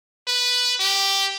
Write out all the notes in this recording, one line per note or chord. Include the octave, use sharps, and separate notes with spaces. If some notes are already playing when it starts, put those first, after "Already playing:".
B4
G4